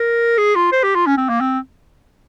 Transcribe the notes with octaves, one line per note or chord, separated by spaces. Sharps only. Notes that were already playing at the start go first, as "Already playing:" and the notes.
Already playing: A#4
G#4
F4
C5
G4
F4
C#4
C4
A#3
C4